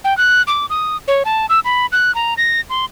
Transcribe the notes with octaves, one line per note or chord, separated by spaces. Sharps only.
G5
F#6
D6
D#6
C#5
A5
E6
B5
F#6
A#5
A#6
C6